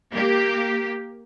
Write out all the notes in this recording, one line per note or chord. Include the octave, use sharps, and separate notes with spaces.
A#3 G4